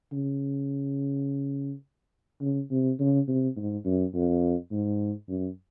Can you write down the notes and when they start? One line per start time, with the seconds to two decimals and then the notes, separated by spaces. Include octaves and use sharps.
0.13 C#3
2.41 C#3
2.71 C3
3.00 C#3
3.28 C3
3.57 G#2
3.85 F#2
4.14 F2
4.72 G#2
5.29 F#2